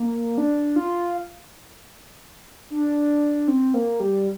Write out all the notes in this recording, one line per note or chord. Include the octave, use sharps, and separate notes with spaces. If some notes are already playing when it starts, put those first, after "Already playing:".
Already playing: A#3
D4
F4
D4
C4
A#3
G3